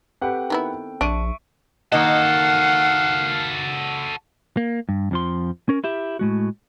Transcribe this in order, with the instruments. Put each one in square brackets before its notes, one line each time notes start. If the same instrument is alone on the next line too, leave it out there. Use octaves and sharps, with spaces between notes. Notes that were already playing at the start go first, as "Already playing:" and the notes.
[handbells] C4 A4 G5 [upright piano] G4 B4 F#5
[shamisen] D#3 B3 E4
[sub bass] A#1 [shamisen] D4 [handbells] E5 C#6 [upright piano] D7 D#7
[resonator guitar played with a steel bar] D#3 A#3 D#5 [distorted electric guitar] F#4 A4 [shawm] F5 [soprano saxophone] F#5
[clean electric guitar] A#3
G2
F2 F3 C6
C#4 A#4
E4 G4 E5
A2 G#3 F#4